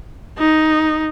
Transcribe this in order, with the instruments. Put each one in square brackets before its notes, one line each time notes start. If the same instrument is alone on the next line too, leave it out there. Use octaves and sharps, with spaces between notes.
[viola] D#4